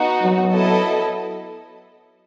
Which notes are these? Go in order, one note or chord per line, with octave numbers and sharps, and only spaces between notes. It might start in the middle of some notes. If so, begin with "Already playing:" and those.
Already playing: B3 D#4 F#4
F#3
B3 E4 A4 D#5 A5